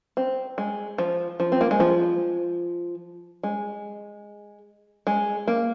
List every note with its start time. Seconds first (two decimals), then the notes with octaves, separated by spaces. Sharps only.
0.17 C4
0.58 G#3
0.98 F3
1.40 F3
1.52 C4
1.61 A#3
1.71 G#3
1.80 F3
3.43 G#3
5.07 G#3
5.48 A#3